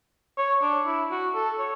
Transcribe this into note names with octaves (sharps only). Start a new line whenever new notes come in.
C#5
D4
E4
F#4
A4
C#5